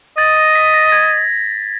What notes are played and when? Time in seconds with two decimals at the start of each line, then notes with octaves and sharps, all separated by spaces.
0.18 D#5 A6
0.37 A#6
0.55 B6
0.74 A#6
0.92 G#6